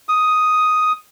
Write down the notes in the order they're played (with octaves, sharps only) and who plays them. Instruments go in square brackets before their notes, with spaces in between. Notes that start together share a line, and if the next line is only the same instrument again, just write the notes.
[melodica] D#6